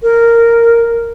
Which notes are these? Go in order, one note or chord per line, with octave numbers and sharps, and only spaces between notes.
A#4